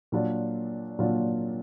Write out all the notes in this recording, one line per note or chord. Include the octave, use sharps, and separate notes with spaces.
A#2 F#3 D4 F4
A#2 F#3 D4 F4